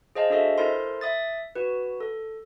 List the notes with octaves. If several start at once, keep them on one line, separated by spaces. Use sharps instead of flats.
G#4 C5 D#5 F5 A5
D4 F#4 G#4 A4 D#5 E5
E4 A4 A#4 C5 C6
E5 D#6 A6
F#4 B4
A4